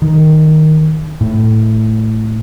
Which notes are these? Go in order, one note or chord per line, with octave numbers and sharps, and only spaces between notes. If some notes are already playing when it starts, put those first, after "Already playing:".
D#3
A2